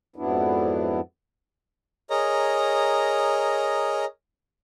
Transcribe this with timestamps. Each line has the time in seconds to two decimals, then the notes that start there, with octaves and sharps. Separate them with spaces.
0.16 F2 G#2 F#3 B3 D4 E4
2.10 G#4 A#4 C#5 D#5 A#5